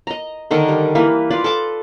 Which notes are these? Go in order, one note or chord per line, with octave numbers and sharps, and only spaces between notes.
D#5 A#5
D3 D#3 A#4 D#5
G3
E3 A#3 B4
F4 B4 D5
A4 A5 D6